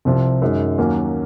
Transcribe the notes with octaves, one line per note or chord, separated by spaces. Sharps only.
C2 C3 F3 C4
F#2 D#3 G#3
D#2 D#3 F#3 A#3 C#4